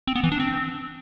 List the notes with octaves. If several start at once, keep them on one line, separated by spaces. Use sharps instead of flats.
C4
B3
E3
D4
C4